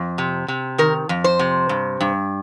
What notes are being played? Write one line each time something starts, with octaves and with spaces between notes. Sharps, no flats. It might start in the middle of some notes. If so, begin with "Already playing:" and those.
Already playing: F2
C3
C3
D#3 A#4
F2
C5
C3
G2
G2